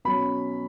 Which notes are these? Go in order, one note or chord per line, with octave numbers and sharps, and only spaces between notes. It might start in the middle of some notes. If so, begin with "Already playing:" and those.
B2 F#3 C#4 B5